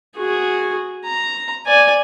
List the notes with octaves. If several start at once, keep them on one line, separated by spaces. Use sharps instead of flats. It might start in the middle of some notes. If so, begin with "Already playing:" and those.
F#4 G#4
A#5
D5 G#5